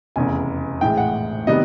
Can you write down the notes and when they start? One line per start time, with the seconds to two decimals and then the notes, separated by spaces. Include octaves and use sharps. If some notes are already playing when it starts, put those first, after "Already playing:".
0.16 F1 E2 C#3 G#5
0.81 A#1 A2 E3 G#3 G5
0.97 F#5
1.47 C3 D#3 G3 B3 D#5